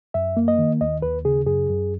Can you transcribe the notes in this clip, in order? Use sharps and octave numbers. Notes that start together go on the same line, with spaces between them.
F#2 E5
A#3
D#5
D#3
D#2 D#5
D#2 B4
C#3 G#4
F#2 G#4
F#2